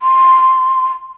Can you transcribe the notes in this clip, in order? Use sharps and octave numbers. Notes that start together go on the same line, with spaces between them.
C6